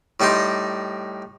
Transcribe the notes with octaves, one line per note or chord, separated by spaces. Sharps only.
A2 G3 D#4 G5 C6